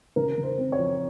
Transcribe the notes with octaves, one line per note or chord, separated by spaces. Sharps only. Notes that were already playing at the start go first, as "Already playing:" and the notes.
C#3 A#4
C#3
C5
C4
C#5
F3